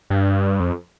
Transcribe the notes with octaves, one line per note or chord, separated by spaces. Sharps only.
G2
F2